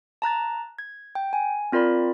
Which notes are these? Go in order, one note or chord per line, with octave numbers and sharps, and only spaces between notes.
A5 A#5 F#6 A6
G#6
G5
G#5
C4 F4 A#4 D5 B5